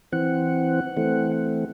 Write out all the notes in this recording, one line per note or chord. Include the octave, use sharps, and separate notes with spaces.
E3 C4 F#5
E3 A3 C4